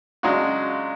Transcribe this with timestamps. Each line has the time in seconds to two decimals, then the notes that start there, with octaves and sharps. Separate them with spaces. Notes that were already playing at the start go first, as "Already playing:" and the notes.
0.23 C#3 F#3 G#3 D4 F4 F#4